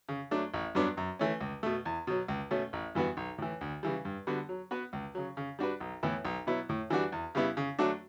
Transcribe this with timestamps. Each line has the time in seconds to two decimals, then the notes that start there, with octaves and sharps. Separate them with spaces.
0.09 C#3
0.31 F#3 A3 D4
0.54 A1
0.75 G2 F#3 B3 D4
0.97 F#2
1.19 E3 A3 C#4
1.41 C#2
1.63 B2 A3
1.85 E2
2.07 B2 F#3
2.28 C#2
2.51 B2 A3 C#4
2.73 A1
2.95 G2 E3 B3 F#4
3.17 B1
3.38 A2 E3
3.61 D2
3.83 C#3 E3 G3
4.05 G2
4.27 D3 G3 B3 F#4
4.49 F#3
4.71 B3 F#4 B4
4.93 C#2
5.15 C#3 F#3
5.37 C#3
5.59 G3 D4 F#4 B4
5.80 B1
6.03 A2 E3 B3 E4
6.25 B1
6.47 B2 F#3 B3 E4
6.69 A2
6.90 E3 G3 D4 F#4
7.12 E2
7.35 C#3 G3 B3 E4
7.57 C#3
7.79 F#3 A3 D4 F#4